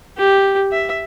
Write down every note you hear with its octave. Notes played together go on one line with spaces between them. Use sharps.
G4
E5